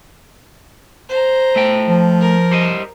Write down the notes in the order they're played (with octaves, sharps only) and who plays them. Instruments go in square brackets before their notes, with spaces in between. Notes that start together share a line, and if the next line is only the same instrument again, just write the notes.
[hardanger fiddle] C5 A#5
[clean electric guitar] A3 G5
[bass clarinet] F3
[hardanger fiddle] A#4
[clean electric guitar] G3 C5 D#5